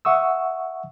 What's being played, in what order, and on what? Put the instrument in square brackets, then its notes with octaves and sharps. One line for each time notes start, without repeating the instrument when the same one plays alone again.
[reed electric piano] E5 F#5 C#6 D#6 E6